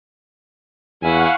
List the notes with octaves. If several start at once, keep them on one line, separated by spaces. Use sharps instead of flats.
E2 E4 F5 F#5 G#5 C#6